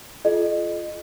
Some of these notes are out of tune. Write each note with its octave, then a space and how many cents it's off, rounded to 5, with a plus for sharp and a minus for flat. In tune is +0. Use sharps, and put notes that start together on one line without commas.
F4 -15 A4 -45 D#5 -25